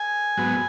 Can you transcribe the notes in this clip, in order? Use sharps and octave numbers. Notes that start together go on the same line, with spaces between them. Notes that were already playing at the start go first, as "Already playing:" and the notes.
Already playing: G#5
G#2 F#3 B3